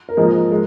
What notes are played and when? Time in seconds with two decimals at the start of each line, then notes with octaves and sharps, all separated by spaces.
0.09 A#4
0.17 G#2 F3 A#3 D#4 G#4
0.52 G#3